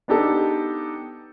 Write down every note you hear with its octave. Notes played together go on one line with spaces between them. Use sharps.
B3 D4 D#4 G4 A4